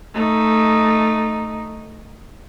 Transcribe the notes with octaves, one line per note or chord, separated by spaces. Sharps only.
A3 D#4